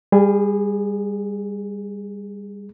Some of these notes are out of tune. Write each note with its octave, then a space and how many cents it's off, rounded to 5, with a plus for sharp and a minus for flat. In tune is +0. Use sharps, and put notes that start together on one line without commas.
G3 +30 G#4 -5